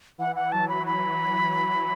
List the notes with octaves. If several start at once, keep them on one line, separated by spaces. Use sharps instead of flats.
E3 F#5
F#5
F#3 A5
B5
F#3 B5